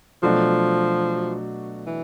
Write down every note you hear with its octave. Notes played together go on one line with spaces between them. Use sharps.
B2 F3 F#3 A3 D4 F#4
E3